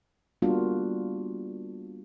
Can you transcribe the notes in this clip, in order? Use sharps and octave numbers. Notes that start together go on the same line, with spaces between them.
G3 A#3 B3 D4 F4 F#4